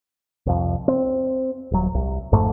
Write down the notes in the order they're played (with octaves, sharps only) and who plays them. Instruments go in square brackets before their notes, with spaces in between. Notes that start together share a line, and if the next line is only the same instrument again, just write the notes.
[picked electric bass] C2 F2
C4
D#1 F#3
C2
G#1 F2 G#2 A3